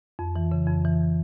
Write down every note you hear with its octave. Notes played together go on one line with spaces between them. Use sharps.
F2
E3
C#3
F2
E3